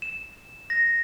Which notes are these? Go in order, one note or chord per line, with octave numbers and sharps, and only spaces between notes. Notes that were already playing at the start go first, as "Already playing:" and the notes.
E7
A#6